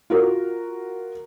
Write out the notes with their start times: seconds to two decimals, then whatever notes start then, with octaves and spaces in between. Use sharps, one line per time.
0.10 F4 F#4 A#4